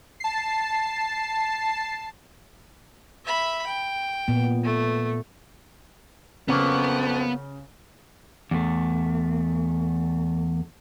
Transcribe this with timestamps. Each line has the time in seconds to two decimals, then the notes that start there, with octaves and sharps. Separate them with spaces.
0.20 A5 C7
3.25 E5 B5
3.66 G5
4.28 A#2 B3
4.63 A3
6.48 F2 C#3 F#3 A#3 B3
8.51 E2 A3